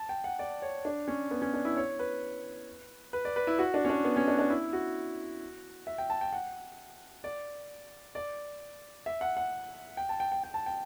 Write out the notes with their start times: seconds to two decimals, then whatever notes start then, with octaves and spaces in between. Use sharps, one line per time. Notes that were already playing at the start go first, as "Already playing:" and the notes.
Already playing: A5
0.09 G5
0.24 F#5
0.39 D5
0.62 C#5
0.85 D4
1.08 C#4
1.31 B3
1.42 C#4
1.53 D4
1.65 E4
1.77 C#5
1.99 B4
3.13 B4
3.25 D5
3.36 B4
3.47 E4
3.59 F#4
3.74 D4
3.85 C#4
3.89 D4
4.04 B3
4.16 C#4
4.28 D4
4.39 D4
4.50 E4
4.73 F#4
5.87 E5
5.98 G5
6.10 A5
6.21 G5
6.33 F#5
7.24 D5
8.15 D5
9.06 E5
9.21 F#5
9.37 F#5
9.97 G5
10.09 A5
10.20 G5
10.32 G5
10.44 G5
10.54 A5
10.66 G5